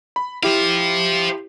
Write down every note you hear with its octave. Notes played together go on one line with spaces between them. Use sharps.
B5
E4 G4 C5 F5